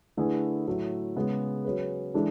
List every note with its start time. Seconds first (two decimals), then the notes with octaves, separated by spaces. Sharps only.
0.17 D3 A3 E4 G#4 B4
0.67 A2 F#3 A3 E4
1.16 C#3 G#3 B3
1.65 F#3 C#4 G#4 B4
2.14 E3 G#3 D4 A4